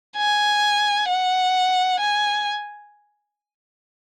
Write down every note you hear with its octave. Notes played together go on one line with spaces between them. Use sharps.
G#5
F#5
G#5